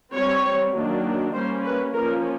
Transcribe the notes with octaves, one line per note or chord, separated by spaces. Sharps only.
G3 C4 C#5
D#3 F#3 A#3 D4
G3 A#3 C#4 C5
B4
F3 A#3 C#4 A#4